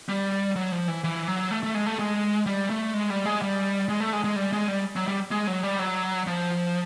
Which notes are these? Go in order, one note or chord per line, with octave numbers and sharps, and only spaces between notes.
G3
F#3
F3
E3
E3
F#3
A3
A3
G#3
A3
G#3
G3
A3
G#3
G3
G#3
G3
G#3
A3
G#3
G#3
G3
G#3
G3
F#3
G3
G#3
F#3
G3
F#3
F3